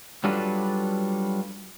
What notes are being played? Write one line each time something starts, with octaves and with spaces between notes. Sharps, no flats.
F#3 G3 D4 F4 A4 B4